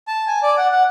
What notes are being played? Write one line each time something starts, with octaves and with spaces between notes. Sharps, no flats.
A5
G#5
D5
F#5
F#5